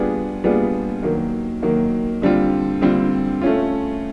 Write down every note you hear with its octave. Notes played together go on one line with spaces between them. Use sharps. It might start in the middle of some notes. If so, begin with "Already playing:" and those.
Already playing: G3 B3 D4 F4 G#4
G3 B3 D4 F4 G#4
D#3 F#3 A#3
D#3 F#3 A#3
D3 G3 C4 F4
D3 G3 C4 F4
A3 C#4 F4